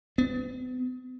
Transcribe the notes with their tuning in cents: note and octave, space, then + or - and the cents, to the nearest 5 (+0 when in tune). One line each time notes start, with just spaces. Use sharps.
B3 +40